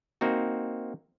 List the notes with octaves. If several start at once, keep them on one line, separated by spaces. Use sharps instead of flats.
A#3 C4 D#4 F#4